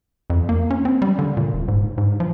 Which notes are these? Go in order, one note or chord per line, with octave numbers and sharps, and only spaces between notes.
F2
A#3
C#4
C4
G3
D3
A#2
D#1
G#2
G#2
F3